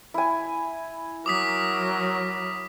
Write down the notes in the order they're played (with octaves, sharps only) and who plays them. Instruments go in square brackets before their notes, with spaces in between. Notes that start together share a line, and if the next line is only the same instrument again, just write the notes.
[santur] E4 G#5
[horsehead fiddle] F#3 A#4 [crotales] D6 D#6 B6